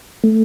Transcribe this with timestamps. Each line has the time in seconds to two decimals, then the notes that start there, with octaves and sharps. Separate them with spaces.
0.24 A3